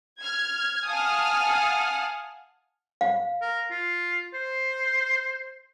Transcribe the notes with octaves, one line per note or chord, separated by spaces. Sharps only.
F6 G#6
F5 F#5 G#5 A5 D#6 F6
F5
A#4
F4
C5